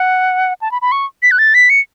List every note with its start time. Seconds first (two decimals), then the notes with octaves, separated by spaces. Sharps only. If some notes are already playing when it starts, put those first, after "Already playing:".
Already playing: F#5
0.62 A5
0.72 B5
0.82 B5
0.92 C#6
1.23 B6
1.31 F#6
1.39 A6
1.54 B6
1.70 C#7